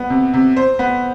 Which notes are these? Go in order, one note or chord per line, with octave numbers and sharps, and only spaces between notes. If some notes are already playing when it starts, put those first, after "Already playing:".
Already playing: B3
C3
C3
C5
B3